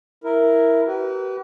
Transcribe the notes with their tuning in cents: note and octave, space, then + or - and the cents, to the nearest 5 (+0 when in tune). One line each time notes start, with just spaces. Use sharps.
E4 +0 A#4 +0
G4 -45 B4 +0